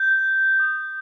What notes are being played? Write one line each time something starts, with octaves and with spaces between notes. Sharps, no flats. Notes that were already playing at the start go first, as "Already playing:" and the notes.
Already playing: G6
D#6
G6